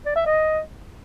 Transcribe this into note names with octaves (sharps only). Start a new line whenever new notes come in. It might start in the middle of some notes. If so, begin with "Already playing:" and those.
D5
E5
D#5